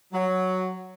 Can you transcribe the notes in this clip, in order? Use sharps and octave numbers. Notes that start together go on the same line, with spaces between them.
F#3